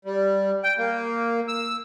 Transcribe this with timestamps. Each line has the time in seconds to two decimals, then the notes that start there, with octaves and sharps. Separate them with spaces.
0.05 G3
0.63 G5
0.78 A#3
1.48 E6